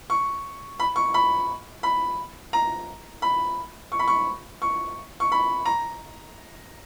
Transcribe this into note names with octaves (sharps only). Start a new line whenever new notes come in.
C#6
B5
C#6
B5
B5
A#5
B5
C#6
B5
C#6
C#6
C#6
B5
A#5